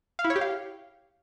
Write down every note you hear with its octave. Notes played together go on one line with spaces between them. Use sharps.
F5
E4
C#5
G4
F5